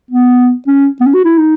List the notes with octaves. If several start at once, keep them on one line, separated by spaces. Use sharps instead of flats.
B3
C#4
B3
C#4
F#4
E4
D#4